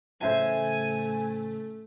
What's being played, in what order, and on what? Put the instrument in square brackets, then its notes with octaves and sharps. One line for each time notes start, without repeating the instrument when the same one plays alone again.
[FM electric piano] A2 C#3 E3 [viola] A3 [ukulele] C5 E5 A5 [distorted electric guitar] G#5